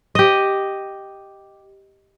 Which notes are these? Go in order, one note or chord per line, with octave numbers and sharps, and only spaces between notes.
G4 D#5